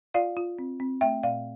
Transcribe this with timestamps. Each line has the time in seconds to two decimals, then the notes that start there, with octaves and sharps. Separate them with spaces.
0.14 F4 D5 F5
0.37 F4
0.59 C4
0.80 C4
1.01 A3 E5 G5
1.23 A#2 D5 F5